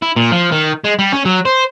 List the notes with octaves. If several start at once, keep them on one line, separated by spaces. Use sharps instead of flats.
E4
A#2
F3
D#3
G#3
G3
C#4
F#3
C5